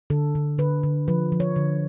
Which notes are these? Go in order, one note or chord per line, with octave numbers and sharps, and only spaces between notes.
D3 A4
D3
D3 B4
D3
F3 B4
F3
C#5
D3